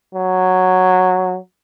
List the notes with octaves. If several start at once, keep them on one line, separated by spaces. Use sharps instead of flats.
F#3